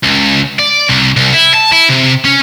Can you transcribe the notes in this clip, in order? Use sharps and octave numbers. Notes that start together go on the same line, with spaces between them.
C#2
D5
C2
C2
E4
A5
E4
C3
C#4